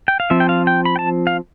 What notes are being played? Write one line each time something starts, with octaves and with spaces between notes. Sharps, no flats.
G5
F5
F3 C4 E5
G5
F5
G5
B5
G5
A5
F5